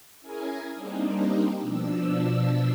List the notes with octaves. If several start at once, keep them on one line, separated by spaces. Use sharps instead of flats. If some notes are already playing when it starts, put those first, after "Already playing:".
C#4 E4 G#4 A#4 G#5
G3 A#3 C4 D4 D#4
B2 F3 D4 E6